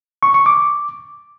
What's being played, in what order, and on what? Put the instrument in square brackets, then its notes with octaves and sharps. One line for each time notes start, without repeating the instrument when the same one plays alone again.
[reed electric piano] C#6
C#6
D6